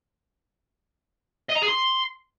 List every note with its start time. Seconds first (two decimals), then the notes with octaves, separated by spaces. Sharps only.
1.50 D#5
1.56 A#5
1.62 G#4
1.69 C6